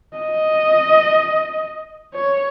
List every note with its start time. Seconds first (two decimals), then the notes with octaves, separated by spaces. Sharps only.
0.17 D#5
2.14 C#5